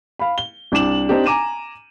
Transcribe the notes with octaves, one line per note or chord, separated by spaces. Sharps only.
F5 B5
G7
C2 D4 D6 E7 F#7
C4 D4 D#4 G4
G#5 A#5 D6 D#7 E7